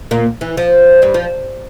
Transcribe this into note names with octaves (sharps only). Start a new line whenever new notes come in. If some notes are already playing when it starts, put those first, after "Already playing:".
A#2 A#3
E3
F3
G2 G3
F3